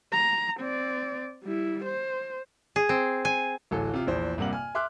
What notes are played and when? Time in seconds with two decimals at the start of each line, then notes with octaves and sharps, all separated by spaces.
0.13 A#5
0.60 C4 D5
1.43 G3 E4
1.84 C5
2.76 G#4
2.89 C4
3.25 G#5
3.71 D1 A1 A4 G#5
3.93 C3 F4
4.07 A#1 E2 C5
4.38 G2 C3 A#3 F#5 F#7
4.53 G#5 F6
4.75 E5 C6 D6 F6 F#6